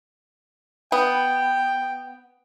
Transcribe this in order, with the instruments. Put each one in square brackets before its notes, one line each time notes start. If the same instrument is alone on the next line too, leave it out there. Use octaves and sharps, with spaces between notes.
[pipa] B3 [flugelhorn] G5